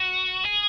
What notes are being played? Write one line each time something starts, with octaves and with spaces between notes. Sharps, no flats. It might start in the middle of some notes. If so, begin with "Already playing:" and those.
Already playing: F#4
G#4